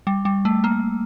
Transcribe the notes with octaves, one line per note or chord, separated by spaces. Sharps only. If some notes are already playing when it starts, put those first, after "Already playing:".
G3
G3
A3
A#3